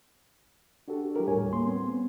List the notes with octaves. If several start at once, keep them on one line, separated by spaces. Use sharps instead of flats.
D4 F#4 G4 A4
F#3 E4 G4 A#4
D#2 A2 G3 C#5 G#5
A#3 C6
B3 C4